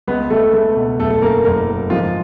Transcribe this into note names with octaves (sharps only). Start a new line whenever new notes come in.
C#2 B3 B4
C#2 A3 A4
C#2 A3 A4
B2
F#1 A3 A4
A4
F#2 A#3 A#4
F#1 A#3 A#4
F#3
G#2 F3 F4